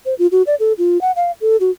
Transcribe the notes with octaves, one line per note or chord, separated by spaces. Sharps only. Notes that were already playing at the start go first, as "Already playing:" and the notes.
C5
F4
F#4
D5
A4
F4
F#5
F5
A4
F#4